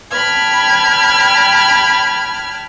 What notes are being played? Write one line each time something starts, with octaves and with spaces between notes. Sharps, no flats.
G5 A5 B5 F6 G#6